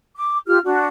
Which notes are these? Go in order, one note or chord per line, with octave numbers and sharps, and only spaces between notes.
D6
F4 G4 F6
D4 F#4